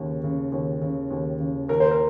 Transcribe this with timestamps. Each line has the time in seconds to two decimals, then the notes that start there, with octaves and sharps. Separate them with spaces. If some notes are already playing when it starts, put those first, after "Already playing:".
Already playing: D#2 C#3
0.24 C#3
0.52 D#2
0.81 C#3
1.10 D#2
1.40 C#3
1.69 D#2 A#4
1.80 C5
1.91 A#4